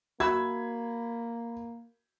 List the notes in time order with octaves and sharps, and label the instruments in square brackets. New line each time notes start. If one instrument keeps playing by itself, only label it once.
[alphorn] A#3 [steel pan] F#4 E5 E6 [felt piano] B5 G#6